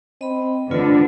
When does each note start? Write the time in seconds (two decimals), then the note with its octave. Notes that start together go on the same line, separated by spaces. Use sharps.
0.21 C4 D#5 B5
0.71 D3 A3 F4 B4